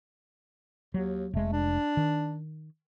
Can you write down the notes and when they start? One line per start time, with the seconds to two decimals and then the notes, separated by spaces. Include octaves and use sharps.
0.94 D#2 F#3
1.34 F1 G#3 A3
1.52 D4
1.97 D#3